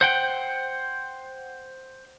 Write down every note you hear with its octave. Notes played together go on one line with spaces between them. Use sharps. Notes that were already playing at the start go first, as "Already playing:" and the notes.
C5 F#5 G5